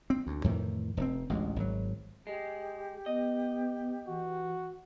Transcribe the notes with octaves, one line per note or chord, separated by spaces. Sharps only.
C4
D2
F2 A2 D#3 E3
F1 C4
A1 D2 G#3
G#1 F#3
G#3 G4
B3 D#5
E3 F#4